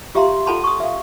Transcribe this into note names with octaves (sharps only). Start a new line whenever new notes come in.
F4 G4 E5 F5 A#5 C6
F4 A4 F#5 A5 B5 C6
C#6 D#6
E5 F5